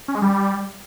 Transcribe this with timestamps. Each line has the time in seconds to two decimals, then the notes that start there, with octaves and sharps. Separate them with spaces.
0.08 C#4
0.15 G#3
0.22 G3